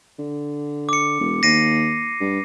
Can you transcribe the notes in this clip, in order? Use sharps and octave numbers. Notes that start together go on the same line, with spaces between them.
D3
D6 C#7
E1
D#2 A#6 C7 D#7
G2